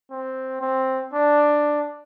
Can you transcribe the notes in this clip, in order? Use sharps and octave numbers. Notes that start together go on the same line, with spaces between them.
C4
C4
D4